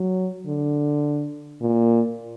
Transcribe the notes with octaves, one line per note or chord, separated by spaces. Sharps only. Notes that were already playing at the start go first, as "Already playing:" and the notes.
Already playing: F#3
D3
A#2